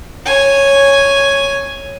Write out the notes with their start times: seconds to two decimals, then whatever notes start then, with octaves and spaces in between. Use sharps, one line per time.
0.26 C#5 G#5